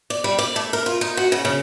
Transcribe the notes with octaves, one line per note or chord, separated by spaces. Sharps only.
D5
G3
D5
A3
A#4
F4
D#4
F#4
C#3
C#3